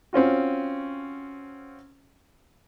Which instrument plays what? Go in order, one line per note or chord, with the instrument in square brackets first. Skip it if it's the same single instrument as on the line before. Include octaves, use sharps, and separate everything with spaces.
[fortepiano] C4 C#4 F4 F#4